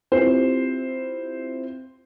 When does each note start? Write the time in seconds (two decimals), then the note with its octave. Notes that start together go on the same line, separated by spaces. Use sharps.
0.12 C4 E4 F4 G4 C5